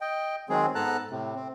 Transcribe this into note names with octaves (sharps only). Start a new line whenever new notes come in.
D#5 G5
D#3 F#3 G#3 C4 G#4
G#2 B3 A4 A5 A#5 F#6
A2 C3
C4